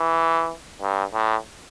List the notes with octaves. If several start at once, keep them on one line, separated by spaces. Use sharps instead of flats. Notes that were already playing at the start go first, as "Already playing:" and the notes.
Already playing: E3
G2
A2